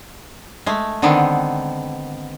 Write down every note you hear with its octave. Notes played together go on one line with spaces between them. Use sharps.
G#3 A3
D3 D#3 G#3 B3 C4